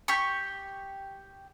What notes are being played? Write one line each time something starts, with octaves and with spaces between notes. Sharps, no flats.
G4 C#6